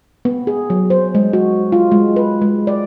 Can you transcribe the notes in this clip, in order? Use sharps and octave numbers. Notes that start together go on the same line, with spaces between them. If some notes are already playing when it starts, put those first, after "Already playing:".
B3
G#4
F#3
C5
G#3
F#4
F4
G#3
B4
G#3
D5